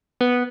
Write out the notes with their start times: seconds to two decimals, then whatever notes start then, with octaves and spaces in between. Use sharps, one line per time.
0.21 B3